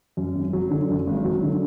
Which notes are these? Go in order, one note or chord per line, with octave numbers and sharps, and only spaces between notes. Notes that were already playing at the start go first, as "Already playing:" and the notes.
F#2
G#1
F#3
D3
F#2
G#1
F#3
D3